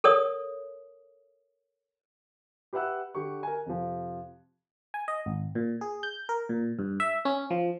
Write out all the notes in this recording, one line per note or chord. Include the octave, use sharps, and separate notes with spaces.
A4 A#4 C#5 D#6
G4 B4 E5 F#5 E6 F#6
D3 G4 C#6
A#4 G#5
F2 C3 F3
G#5
D#5
G#1
A#2
G#4
G6
A#4
A#2
G2
E5
C#4
F3